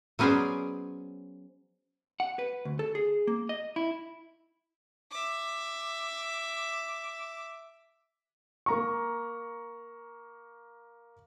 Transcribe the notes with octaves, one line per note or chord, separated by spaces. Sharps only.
F#3 B3 C#4 G#4 C5 D5
F#5
B4
D2
A4
G#4
A#3
D#5
E4
E5 D6
A#3 A#5 C#6